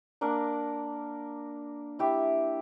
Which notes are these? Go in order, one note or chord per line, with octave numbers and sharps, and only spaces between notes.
A#3 D4 A#4 F#5
E4 G4 E5